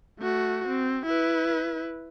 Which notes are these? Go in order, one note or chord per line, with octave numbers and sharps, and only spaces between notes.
A3 F#4
C4
E4 B4